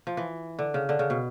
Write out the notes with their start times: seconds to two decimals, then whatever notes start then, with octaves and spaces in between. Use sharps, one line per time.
0.07 F3
0.17 E3
0.59 D3
0.74 C#3
0.89 D3
0.99 C#3
1.10 B2